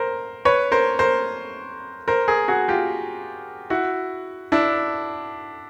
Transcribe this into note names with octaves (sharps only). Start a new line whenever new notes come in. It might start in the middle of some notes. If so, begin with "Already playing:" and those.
Already playing: A#4 C5
B4 C#5
A#4 C5
A#4 C5
A#4 C5
G#4 A#4
F#4 G#4
F4 G4
E4 F#4
D4 E4